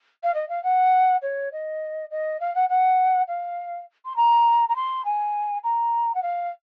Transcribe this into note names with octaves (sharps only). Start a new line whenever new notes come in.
F5
D#5
F5
F#5
C#5
D#5
D#5
F5
F#5
F#5
F5
C6
A#5
A#5
C6
G#5
A#5
F#5
F5